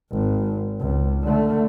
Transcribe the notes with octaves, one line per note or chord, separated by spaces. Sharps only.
G#1
C#2
D3 A3